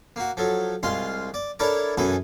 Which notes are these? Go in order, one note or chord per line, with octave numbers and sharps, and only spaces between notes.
A#3 F#4
F3 F#3 A4
C2 G#3 F4 F5 C6
D5
D4 E4 A4 A#4 C#5 D5
F#2 E3 F#4 G#4 A4 B4